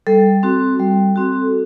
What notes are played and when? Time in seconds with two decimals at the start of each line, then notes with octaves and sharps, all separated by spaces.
0.07 G3 A4
0.43 C4 F#4
0.79 G3
1.16 C4 F#4